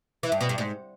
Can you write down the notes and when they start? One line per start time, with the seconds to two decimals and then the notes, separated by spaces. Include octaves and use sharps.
0.23 E3
0.32 G2
0.41 B2
0.49 G2
0.58 G#2